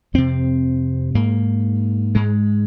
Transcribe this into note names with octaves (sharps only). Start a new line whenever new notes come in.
F2 C3 C4
G#2 A#3
G#2 G#3